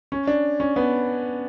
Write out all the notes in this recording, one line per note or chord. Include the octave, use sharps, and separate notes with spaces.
C#4
D4
C#4
B3